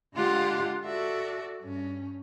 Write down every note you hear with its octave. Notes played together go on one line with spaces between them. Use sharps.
D3 G#3 F4 G4 F5 F#5
F#4 A4 D5 E5
G2 C#4